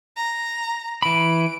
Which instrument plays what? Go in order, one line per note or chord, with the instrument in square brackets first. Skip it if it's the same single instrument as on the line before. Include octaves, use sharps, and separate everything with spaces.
[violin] A#5
[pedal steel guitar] E3 B5 [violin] D7